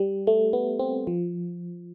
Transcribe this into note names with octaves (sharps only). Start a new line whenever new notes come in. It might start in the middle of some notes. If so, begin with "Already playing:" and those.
Already playing: G3
A3
B3
C4
F3